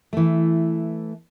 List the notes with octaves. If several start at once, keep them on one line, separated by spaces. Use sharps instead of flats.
E3 A3